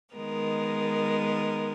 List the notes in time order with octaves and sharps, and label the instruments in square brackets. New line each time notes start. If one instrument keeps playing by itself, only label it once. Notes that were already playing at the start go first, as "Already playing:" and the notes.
[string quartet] D#3 G#3 B3 A#4